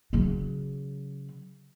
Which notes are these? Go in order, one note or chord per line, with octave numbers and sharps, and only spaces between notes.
C#3 F#3